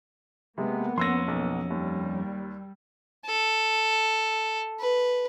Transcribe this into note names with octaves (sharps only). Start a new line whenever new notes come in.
C3 G#3 A#3 B3
F2 C#4 C6 E6 A#6
B1
D#2 G3
A4
B4